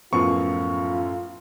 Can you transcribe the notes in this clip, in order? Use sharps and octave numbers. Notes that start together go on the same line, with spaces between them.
F#2 A2 F3 B3 F4 C#6